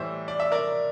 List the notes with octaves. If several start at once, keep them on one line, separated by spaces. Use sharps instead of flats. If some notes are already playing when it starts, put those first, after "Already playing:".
Already playing: A2 E3 G3 C5 E5
D5
E5
A#4 D5